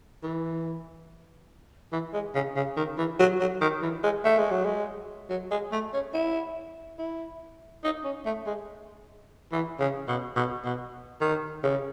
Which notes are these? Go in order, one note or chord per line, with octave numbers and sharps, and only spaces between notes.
E3
E3
G#3
C#3
C#3
D#3
E3
F#3
F#3
D#3
E3
G#3
A3
G#3
F#3
G#3
F#3
G#3
A3
C#4
E4
E4
D#4
C#4
A3
G#3
E3
C#3
B2
B2
B2
D#3
C#3